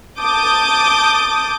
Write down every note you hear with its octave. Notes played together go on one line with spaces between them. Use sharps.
A5 D6 D#6 G6